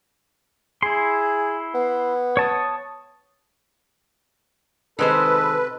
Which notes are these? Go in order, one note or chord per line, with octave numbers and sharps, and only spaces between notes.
E4 G#4 C6
B3
C#5 A5 D#6
C3 D#3 G#3 D#4 A4 B4 C5